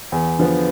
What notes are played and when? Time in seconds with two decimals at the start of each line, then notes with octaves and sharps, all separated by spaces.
0.12 E2
0.39 D3 F3 B3